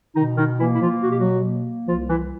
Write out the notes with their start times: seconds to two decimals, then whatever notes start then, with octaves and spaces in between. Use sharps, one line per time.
0.16 B2 D#3 D#4
0.37 D#3 D#4
0.58 E3 A#3 E4
0.72 E4
0.80 F3 F4
1.01 B2 F#4
1.10 G4
1.19 F#3 F#4
1.44 A#3
1.87 C2 F3 F4
2.09 E3 E4